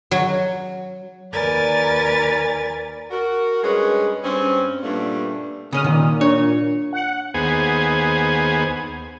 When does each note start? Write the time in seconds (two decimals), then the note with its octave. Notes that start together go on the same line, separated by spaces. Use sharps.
0.11 F#3
1.32 D#2 A#4 B4 D5 G#5 A6
3.11 F#4 A#4
3.63 G2 G#3 C#4 G#4 B4
4.23 G2 C4 C#4
4.83 G2 A#2 G3 A3 B3 D4
5.72 C#3 C#4 D#6 F6
5.84 A#2 D#3
6.21 D4 C#5
6.93 F#5
7.34 D#2 B3 G#4 C5 G#5